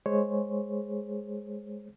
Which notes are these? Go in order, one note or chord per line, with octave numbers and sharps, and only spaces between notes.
G#3 G#4 C5 C#5